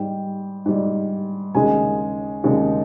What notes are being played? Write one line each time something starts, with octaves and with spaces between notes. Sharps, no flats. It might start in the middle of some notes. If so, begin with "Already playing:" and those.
Already playing: G#2 G3 G5
G#2 G3
D#2 C#3 G#3 G#5
D#2 C#3 G#3